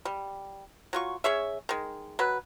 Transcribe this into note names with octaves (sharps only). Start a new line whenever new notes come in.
G3
F#3 F4 C#6
C#4 G#4 C#5 E5
D#3 G#3
F#3 B4